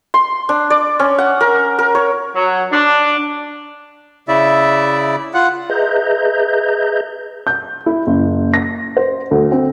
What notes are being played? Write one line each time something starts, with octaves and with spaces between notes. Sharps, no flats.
C6
D4
D5
C#4
F#5
A#4
A#4
C#5
F#3
D4
C#3 E4 D5 E5
F4 F#5
G#4 B4 D#5 E5 A#5 G6
G6
E4
F#1
A#6
C5
D2
C4